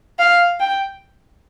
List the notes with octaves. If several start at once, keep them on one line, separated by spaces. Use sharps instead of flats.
F5
G5